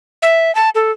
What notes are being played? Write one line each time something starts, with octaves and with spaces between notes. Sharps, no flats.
E5
A5
A4